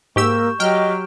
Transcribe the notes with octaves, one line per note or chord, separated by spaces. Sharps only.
G#2 A#3 G4 C#6 E6 G6 E7
F#3 G4 D#5 G5 F6 D7